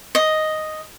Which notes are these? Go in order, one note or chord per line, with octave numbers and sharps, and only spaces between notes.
D#5